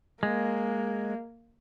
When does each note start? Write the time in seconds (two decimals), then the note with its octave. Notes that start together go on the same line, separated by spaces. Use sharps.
0.23 G#3 A#3